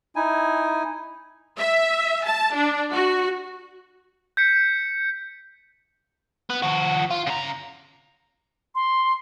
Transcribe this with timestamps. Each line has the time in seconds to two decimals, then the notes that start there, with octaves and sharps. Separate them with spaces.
0.16 D#4 E4 G#5
1.57 E5
2.26 A5
2.55 D4
2.92 F#4
4.37 G6 B6 C#7
6.50 B3
6.63 F3 F#4
7.11 F4
7.27 C#3 A#5
8.75 C6